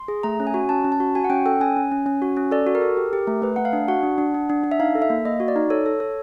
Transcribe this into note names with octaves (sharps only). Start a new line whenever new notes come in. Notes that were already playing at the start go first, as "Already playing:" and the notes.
Already playing: C6
G#4
A3 A#5
C#4
G#5
F#4
C#4 A5
C#4
A5
F#4
F#4 G#5
F#5
C#4 G5
A4 G5
C#4 G#5
C#4
C#4
C#4
F#4
C#4
A4 D5
F#4
A#4
A4
G4
G4
A3
A3 B4
A3 F#5
F5
D4
F#4 F#5
D4
D4
D4
D4
D4
E5
D#4 F5
A4
E5
A#3
A#3 D#5
F#4
D5
D#4
A4 C#5
A4
A4